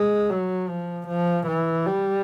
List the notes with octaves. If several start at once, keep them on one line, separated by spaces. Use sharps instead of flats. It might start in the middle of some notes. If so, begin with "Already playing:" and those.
Already playing: G#3
F#3
F3
F3
E3
G3